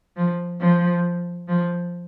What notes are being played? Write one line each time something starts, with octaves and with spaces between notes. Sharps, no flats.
F3
F3
F3